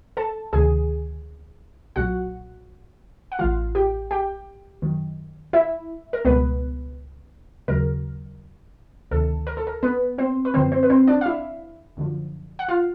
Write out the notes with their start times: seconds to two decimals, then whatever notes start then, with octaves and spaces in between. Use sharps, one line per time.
0.17 A4 A5
0.53 D2 C3 D#3 G#4 G#5
1.96 B1 A#2 F#3 F#4 F#5
3.32 F#5
3.39 A1 A2 E3 F4 F5
3.75 G4 G5
4.11 G4 G5
4.82 F#2 D#3 F#3
5.53 E4 E5
6.13 A#4
6.25 C#2 B2 G3 B3 B4
7.68 D#2 C#3 F#3 A#4
9.11 D2 C3 D#3 A4
9.47 A#4
9.57 A4
9.67 A#4
9.83 B3 B4
10.18 C4 C5
10.45 B4
10.54 F#2 D3 F3 C4 C5
10.72 C4 C5
10.83 B4
10.90 C4 C5
11.08 D4 D5
11.21 F5
11.26 E4 E5
11.97 F#2 D3 F3
12.59 F#5
12.69 F4 F5